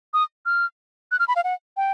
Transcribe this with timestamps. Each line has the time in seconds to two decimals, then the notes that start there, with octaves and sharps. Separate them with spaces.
0.14 D#6
0.46 F6
1.11 F#6
1.19 F6
1.28 B5
1.36 F5
1.44 F#5
1.77 G5